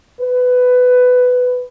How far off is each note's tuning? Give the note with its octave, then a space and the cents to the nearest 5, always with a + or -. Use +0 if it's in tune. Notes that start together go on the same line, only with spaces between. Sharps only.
B4 +15